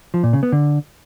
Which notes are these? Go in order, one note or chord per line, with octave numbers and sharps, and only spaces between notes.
F3
A#2
C#3
B3
D3